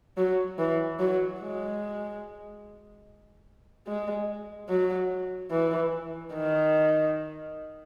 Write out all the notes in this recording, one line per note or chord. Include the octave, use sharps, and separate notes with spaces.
F#3
E3
F#3
G#3
G#3
F#3
E3
D#3